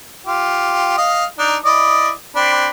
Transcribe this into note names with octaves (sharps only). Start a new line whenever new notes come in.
F4 G4
D#5 F5
D4 D#4
E4 D5 D#5
C4 D4 B5